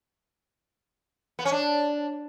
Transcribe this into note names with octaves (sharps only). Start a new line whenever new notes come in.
B3
C#4
D4